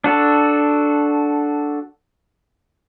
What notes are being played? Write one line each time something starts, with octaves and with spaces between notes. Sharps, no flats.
D4 F#4 A4